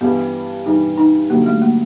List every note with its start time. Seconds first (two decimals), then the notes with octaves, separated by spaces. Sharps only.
0.01 G2 E3 G3 B3
0.66 G2 E3 G3 D#4
0.98 D#4
1.30 G2 D3 F#3 A#3
1.46 A3
1.61 A#3